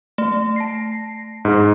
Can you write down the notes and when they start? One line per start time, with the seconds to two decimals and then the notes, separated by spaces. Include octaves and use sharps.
0.18 A3
0.56 A5 A#6 C7
1.45 G#2